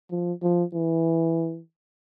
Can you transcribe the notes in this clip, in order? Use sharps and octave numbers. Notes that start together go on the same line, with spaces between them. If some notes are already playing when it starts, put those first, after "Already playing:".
F3
F3
E3